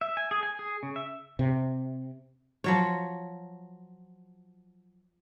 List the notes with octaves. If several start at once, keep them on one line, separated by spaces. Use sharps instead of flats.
E5
G#5
G#4
G#5
G#4
C#3
E5
C3
F3 F#3 C#5